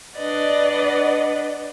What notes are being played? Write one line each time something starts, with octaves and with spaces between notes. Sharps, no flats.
D4 B4 D5 D#5 F#5